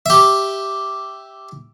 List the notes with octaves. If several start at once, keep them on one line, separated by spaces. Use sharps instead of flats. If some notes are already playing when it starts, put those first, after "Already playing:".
G4 E5